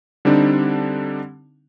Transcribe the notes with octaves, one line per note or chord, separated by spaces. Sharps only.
D3 G3 C4 D4 D#4